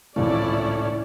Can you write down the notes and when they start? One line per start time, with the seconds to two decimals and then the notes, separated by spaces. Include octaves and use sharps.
0.16 G#1 C#2 A2 E3 C#4 E4 D5